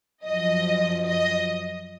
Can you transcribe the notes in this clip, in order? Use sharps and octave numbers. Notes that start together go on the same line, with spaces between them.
F#2 F3 D#5
D#5